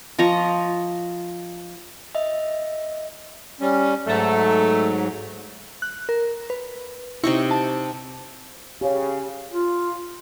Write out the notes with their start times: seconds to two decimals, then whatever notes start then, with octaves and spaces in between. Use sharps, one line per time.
0.19 F3 D#5 A#5 C#6
2.15 D#5 E5
3.60 G3 C#4
4.07 G#2 F#3 A3
5.82 F#6
6.09 A#4
6.50 B4
7.24 C3 D#4 E4 C#6
7.51 A5
8.81 C#3 G4 C#5
9.51 F4